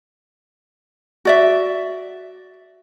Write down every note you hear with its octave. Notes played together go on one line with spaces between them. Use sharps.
F#4 D5 E5